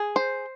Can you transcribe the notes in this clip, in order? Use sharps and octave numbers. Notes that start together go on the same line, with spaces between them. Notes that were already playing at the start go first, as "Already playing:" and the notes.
Already playing: G#4
C5